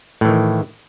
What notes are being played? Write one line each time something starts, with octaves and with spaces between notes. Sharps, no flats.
A2 D#3 E3